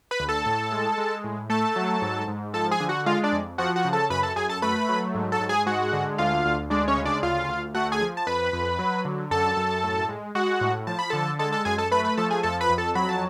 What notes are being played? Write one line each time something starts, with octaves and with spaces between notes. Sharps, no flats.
B4 B5
D2
A4 A5
A2
G#3
G#3
A2
A3 A4 A5
F#3
G#2
G#2
F3 A4 A5
G#4 G#5
D3
F#4 F#5
G#3 F4 F5
D4 D5
F2
F3 F#4 F#5
F#4 F#5
C#3
A4 A5
F#2 B4 B5
A4 A5
F#2 G#4 G#5
A4 A5
A3 B4 B5
F#3
G#2
A4 A5
G#2
G#4 G#5
G#3 F#4 F#5
D3
D2 F4 F5
D2
G#3 D4 D5
C#4 C#5
C#3
D4 D5
D2 F4 F5
D2
A3 F#4 F#5
G#4 G#5
F3
A5
F2 B4 B5
F2
F#3
D3
F#2 A4 A5
F#2
A2
G#3
G#3 F#4 F#5
A2
F3 A5
B5
D3 A4 A5
G#3 A4 A5
A4 A5
F#2 G#4 G#5
A4 A5
A3 B4 B5
B4 B5
F3 A4 A5
G#4 G#5
F2 A4 A5
B4 B5
F2
A4 A5
F#3 B5
A5